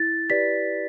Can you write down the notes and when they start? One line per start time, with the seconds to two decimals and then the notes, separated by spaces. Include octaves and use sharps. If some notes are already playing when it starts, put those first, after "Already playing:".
Already playing: E4 A6
0.29 G4 B4 D5 B6